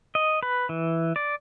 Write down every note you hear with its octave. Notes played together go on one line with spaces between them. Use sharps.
D#5
B4
E3
D5